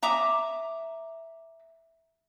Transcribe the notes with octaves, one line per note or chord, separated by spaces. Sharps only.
E5 A#5 D6 D#6